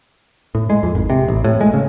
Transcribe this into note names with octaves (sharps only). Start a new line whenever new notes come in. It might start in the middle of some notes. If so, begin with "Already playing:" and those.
A2
G#3
F2
G#1
C3
A1
A2
G#3
C#3